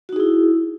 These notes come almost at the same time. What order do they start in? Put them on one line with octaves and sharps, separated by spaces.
F#4 D#4 G#4 E4